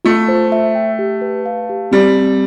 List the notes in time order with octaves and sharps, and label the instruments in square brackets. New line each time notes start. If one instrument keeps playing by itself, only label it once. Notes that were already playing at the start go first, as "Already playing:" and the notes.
[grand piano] A3 [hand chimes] F4
[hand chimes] C5
E5
G5
G4
B4
F5
G4
[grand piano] G3 [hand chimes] C4
[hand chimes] G4